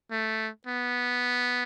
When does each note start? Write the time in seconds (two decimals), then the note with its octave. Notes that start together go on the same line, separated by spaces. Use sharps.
0.11 A3
0.67 B3